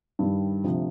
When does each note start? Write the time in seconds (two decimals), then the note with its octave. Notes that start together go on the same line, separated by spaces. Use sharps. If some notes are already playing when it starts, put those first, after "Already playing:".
0.19 G2 D#3 G3
0.64 D2 C3 F3